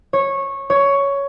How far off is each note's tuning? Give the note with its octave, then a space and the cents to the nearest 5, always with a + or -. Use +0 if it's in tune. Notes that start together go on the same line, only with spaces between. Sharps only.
C#5 -15
C#5 +10